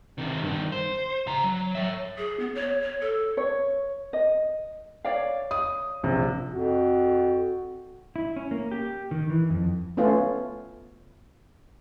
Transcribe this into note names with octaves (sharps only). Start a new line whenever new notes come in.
C3 D#3
G2 D#3
C5
C#3 A#5
F#3
C#5 E5
G#4
B3
C#5
C#5
A4
C#5
D#5
C#5 D5 F5
D#6
A#1 C3
F2 F#4
E4
C#4
A#3
G4
D#3
E3
F2
A3 B3 C#4 F4